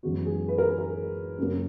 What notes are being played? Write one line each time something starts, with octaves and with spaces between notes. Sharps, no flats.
F#2 E3 G#3 B3 F#4
G#4
B4
A#4
G#4
A#4
F#2 C#3 F#3 A#3